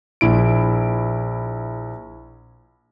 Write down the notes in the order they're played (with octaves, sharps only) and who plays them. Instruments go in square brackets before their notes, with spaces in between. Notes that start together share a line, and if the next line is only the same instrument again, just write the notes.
[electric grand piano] A#1 E4 D7